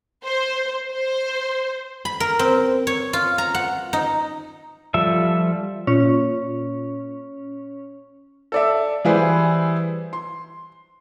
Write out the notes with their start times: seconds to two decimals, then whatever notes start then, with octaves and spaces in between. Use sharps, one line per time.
0.24 C5
0.92 C5
2.05 B5
2.20 A#4
2.39 C4
2.87 C#5
3.13 F4
3.38 A#5
3.55 F#5
3.93 D#4
4.94 F3 G3 A4 E5
5.87 A#2 C#4
8.52 A4 D5 E5
9.05 E3 G3 E4 G#4 B4 C5
10.13 C6